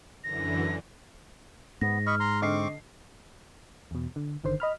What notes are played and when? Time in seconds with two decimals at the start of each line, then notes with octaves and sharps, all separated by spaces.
0.24 F#2 D3 E3 A#6
1.81 G#2 B3 A#6
2.07 D#5 B5 C#6 F6
2.20 A#5 C6
2.42 D3 C4 D#5 C#6 D6 C7
3.91 E2 B2
4.16 D3
4.44 G1 D3 D#3 C5 C6
4.60 D#5 B5 F6